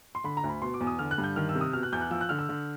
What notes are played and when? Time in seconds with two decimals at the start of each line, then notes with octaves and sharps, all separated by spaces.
0.15 C6
0.24 D3 B5
0.37 A#5
0.44 D2
0.49 B5
0.62 B2 C6
0.74 D6
0.81 E2
0.87 D#6
0.99 D3 F6
1.11 F#6
1.18 G2
1.24 G6
1.36 D#3 F6
1.49 E6
1.55 C3
1.61 D#6
1.73 B2 F6
1.83 F#6
1.93 E2 G6
2.01 F#6
2.11 F3 E6
2.21 F#6
2.29 D3 F6
2.39 E6
2.49 D3